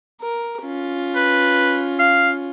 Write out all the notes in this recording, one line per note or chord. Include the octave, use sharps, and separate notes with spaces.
A#4
C#4 F4
B4
F5